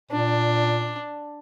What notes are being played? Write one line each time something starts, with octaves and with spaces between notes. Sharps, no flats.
A#2 D4